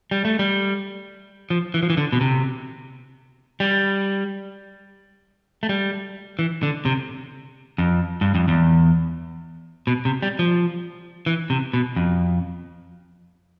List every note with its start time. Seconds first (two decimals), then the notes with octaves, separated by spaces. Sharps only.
0.11 G3
0.25 A3
0.39 G3
1.50 F3
1.74 E3
1.83 F3
1.90 E3
1.97 D3
2.13 B2
2.21 C3
3.60 G3
5.63 A3
5.69 G3
6.39 E3
6.63 D3
6.85 C3
7.78 F2
8.21 G2
8.35 F2
8.48 E2
9.87 B2
10.05 C3
10.22 G3
10.39 F3
11.26 E3
11.50 C3
11.73 B2
11.96 F2